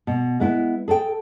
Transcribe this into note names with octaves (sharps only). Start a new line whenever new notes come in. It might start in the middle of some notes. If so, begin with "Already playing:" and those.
B2
G#3 B3 E4
G#4 A4 D5 G5